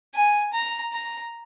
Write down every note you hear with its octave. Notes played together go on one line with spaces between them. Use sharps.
G#5
A#5
A#5